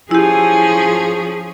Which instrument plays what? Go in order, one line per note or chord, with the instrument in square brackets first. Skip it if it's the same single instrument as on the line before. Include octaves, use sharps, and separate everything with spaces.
[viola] F3 C#4 [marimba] E4 G4 [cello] G#4 [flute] G#5